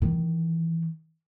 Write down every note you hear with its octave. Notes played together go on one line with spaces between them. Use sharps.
D#3 E3